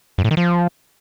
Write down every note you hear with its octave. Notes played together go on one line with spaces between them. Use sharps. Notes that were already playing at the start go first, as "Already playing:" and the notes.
F#2
A2
D#3
F3